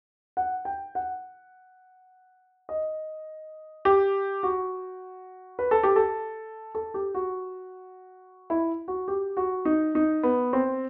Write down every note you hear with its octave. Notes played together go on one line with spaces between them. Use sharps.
F#5
G5
F#5
D#5
G4
F#4
B4
A4
G4
A4
A4
G4
F#4
E4
F#4
G4
F#4
D#4
D#4
B3
C4